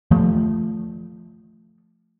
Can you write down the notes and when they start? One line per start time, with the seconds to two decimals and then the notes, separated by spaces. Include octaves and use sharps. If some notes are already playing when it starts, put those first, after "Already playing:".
0.11 F3 A3